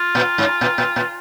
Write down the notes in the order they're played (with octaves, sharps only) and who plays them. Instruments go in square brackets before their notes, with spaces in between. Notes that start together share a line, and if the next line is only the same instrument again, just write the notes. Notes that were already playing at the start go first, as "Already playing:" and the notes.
Already playing: [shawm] F4
[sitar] A#2
G#2
A#2
A#2
A#2